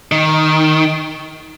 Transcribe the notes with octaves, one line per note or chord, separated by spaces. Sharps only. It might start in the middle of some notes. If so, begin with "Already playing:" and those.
D#3